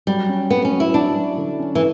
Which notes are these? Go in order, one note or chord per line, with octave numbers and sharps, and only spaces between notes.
F#3 G3
C#4
B3 F#4
C#4
F#3
E4
D4 F#4
F#3
D3
C#4
E3